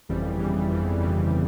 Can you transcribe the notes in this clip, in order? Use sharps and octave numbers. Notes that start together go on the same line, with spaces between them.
G1 F2 C#3 E3 G3
G1 F2 C#3 E3 G3
G1 F2 C#3 E3 G3
G1 F2 C#3 E3 G3